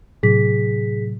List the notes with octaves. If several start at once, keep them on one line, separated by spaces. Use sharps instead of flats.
A2 C3 F#3 G#4 B6